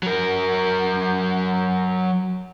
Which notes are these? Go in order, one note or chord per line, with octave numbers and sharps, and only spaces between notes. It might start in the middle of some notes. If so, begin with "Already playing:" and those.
F#3 A#4